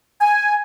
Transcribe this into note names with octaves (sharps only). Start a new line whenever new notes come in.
G#5